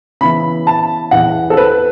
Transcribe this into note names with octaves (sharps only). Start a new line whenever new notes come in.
C#3 E3 B3 E4 B5
A5
E2 E3 B3 F#5
A4
B4